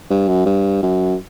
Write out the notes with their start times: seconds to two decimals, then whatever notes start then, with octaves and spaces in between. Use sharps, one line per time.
0.11 G2
0.28 F#2
0.46 G2
0.83 F#2